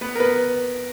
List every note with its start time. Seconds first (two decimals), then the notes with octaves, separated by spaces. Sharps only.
0.01 B3 B4
0.15 A#4
0.20 B3 B4